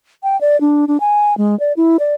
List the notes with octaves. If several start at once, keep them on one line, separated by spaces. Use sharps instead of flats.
G5
D5
D4
D4
G#5
G#3
D5
E4
D5